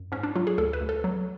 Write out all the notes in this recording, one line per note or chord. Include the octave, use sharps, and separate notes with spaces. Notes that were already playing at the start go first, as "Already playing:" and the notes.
Already playing: F#2
G#2 C#4
D4
F#3 F4
G#4
D2 A4
B4
D2
A4
F#3